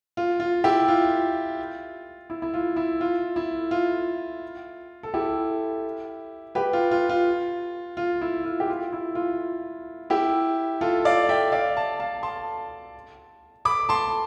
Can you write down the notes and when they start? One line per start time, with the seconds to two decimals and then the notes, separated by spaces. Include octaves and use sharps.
0.17 F4
0.40 F4
0.64 E4 G4
0.88 F4
2.30 E4
2.42 E4
2.54 F4
2.76 E4
3.01 F4
3.36 E4
3.71 F4
5.03 A4
5.14 E4 G4
6.55 G4 B4
6.73 F4
6.91 F4
7.09 F4
7.97 F4
8.21 E4
8.45 F4
8.60 G4
8.69 F4
8.93 E4
9.15 F4
10.10 E4 G4
10.81 F4 A4
11.05 D5 F5
11.29 E5 G5
11.52 D5 F5
11.76 F5 A5
12.00 F5 A5
12.23 A5 C6
13.65 B5 D6
13.89 A5 C6